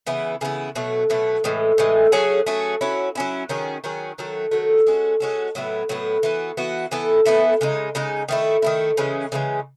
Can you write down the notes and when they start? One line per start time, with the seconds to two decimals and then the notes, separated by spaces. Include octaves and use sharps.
0.06 C#3 E3 B3 E4
0.41 C#3 E3 B3 E4
0.75 B2 F#3 A3
1.10 B2 F#3 A3
1.44 A2 E3 G#3
1.78 A2 E3 G#3
2.12 F#3 A3 C#4 G#4
2.46 F#3 A3 C#4 G#4
2.81 F#3 C#4 E4
3.15 F#3 C#4 E4
3.49 D#3 F#3 C#4 G#4
3.84 D#3 F#3 C#4 G#4
4.18 D#3 F#3 A3
4.51 D#3 F#3 A3
4.87 G#3 C#4 F#4 A4
5.20 G#3 C#4 F#4 A4
5.55 A2 F#3 B3 E4
5.89 A2 F#3 B3 E4
6.23 E3 B3 F#4
6.57 E3 B3 F#4
6.91 E3 B3 E4 A4
7.25 E3 B3 E4 A4
7.61 C#3 G#3 D#4
7.95 C#3 G#3 D#4
8.28 D#3 A3 E4
8.62 D#3 A3 E4
8.97 C#3 E3 G#3 C#4
9.32 C#3 E3 G#3 C#4